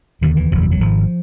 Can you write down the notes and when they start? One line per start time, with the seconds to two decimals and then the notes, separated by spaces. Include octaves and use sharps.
0.21 E1 D#2 D3 D#3
0.36 E3
0.51 F#1 E2 B2 F3
0.61 G3
0.71 F#3
0.80 G#1 G#2 F3